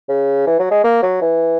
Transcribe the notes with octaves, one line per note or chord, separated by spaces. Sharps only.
C#3
E3
F#3
G#3
A#3
F#3
E3